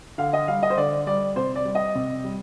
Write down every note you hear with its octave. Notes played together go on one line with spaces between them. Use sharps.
D3 F5
D#5
G3 F5
D#5
C5
D3 D5
G3 D5
C3 C5
D5
G3
D#5
C3
G3